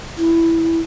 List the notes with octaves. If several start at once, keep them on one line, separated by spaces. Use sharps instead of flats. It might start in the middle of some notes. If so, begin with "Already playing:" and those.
E4